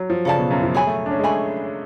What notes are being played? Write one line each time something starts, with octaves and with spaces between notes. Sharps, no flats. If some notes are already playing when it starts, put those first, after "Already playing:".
Already playing: F#3
F3
C#3 A4 D5 F5 A5
B2
F#2
F3
F#3 G#4 C#5 G#5 B5
A3
D4
C#4
G#3
A3 G#4 C#5 G#5 B5